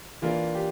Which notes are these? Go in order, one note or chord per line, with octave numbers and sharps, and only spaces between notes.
E3 A#3 D4 F4
G4